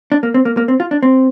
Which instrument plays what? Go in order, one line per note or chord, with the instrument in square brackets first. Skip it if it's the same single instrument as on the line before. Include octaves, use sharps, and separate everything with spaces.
[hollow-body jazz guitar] D4
A#3
C4
A#3
A#3
C4
F4
D4
C4